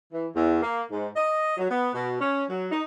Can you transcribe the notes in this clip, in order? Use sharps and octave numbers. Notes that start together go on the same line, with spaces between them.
E3
E2
A#3
G#2
D#5
F#3
B3
B2
C#4
F#3
D#4